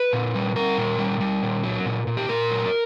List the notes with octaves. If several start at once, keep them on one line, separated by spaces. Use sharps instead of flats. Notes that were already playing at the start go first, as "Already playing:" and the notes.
Already playing: B4
A#2
G3
G3 A#4
A#2
G3
G3
A#2
F#3
A#2
A#2
G4
A#2 A#4
F#3